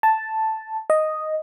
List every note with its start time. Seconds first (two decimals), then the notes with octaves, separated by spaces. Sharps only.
0.03 A5
0.90 D#5